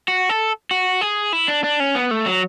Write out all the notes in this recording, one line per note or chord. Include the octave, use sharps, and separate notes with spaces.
F#4
A4
F#4
G#4
E4
D4
D4
C#4
B3
A3
F#3